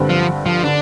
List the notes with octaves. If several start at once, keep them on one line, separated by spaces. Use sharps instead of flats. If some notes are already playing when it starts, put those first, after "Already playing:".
Already playing: G2 D3 G3 C4
F3
F3
D3 D4